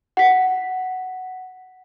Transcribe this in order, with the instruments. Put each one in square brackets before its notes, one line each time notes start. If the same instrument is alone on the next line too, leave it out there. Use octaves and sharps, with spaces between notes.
[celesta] F#5 B6